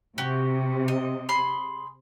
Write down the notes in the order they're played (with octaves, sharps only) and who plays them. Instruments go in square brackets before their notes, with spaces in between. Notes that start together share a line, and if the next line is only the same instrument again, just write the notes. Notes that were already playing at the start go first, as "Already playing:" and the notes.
[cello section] C3 [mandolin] F#4 G4
[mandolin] D#5
G#4 B5 C6